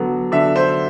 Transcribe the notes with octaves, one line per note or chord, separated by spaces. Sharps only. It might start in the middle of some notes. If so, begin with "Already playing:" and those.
Already playing: D3 F#3 B3
D3 E5
C5